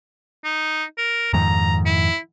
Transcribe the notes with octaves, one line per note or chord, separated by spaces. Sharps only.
D#4
A#4
F2 G#2 D#3 A#5
E4